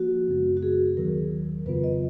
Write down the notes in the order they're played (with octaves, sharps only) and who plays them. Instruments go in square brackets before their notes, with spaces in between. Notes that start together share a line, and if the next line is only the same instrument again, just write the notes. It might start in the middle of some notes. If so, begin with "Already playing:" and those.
Already playing: [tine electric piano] F3 A#3 [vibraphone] F#4
[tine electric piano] F#2 C#3 G#3 B3
[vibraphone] F#4
G#4
[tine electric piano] D#2 D#3 F#3 [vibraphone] A#4
[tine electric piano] F2 C#3 F#3 B3 F4 [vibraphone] B4
[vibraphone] D#5